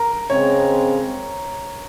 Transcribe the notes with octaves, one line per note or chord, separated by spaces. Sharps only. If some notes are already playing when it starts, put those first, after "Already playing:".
Already playing: A#4
C#3 G#3 C4 C#5